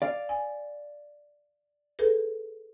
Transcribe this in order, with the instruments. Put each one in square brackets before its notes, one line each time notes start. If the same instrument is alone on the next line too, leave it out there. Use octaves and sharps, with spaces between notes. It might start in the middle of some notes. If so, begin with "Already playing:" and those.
[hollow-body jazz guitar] D5 F5
[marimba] G#5
G#4 A4 B4